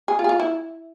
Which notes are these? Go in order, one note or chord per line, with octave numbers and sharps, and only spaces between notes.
G#4
F4
G#4
F4
E4